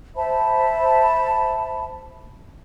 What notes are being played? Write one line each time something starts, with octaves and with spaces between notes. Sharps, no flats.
C5 E5 A5 B5